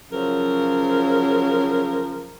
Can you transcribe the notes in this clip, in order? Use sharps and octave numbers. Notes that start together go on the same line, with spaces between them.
C#3 F3 F#3 A#4